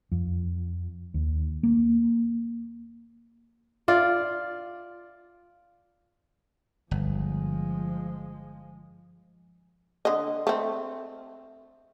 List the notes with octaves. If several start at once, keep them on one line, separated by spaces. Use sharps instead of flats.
F2
D#2
A#3
F4 D5
G1 F3 G#3
D3 D#5
A3 C4